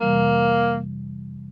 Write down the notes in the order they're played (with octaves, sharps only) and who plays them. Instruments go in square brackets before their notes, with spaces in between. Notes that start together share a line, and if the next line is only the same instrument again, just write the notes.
[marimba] F2 C3 E3 G3 [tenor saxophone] A#3